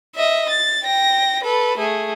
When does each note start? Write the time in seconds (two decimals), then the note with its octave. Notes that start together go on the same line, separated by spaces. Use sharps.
0.16 D#5 E5
0.49 A6
0.83 G5 A#6
1.44 A4 B4
1.78 A3 G#4